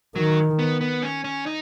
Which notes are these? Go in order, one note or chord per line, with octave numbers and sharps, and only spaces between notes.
D#3 F#3
B3
B3
C#4
C#4
D#4